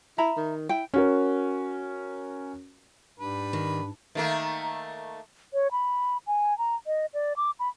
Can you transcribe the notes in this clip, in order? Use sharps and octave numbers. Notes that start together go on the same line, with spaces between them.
E4 E5 A#5 B5
D#3
E4 G5
C#4 F#4 A#4
G#2 G3 D4 B4
D#3
D#3 A3 A#3
C#5
B5
G#5
A#5
D#5
D5
D6
B5